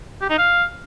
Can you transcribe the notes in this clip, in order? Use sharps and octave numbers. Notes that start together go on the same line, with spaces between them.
G4
D#4
F5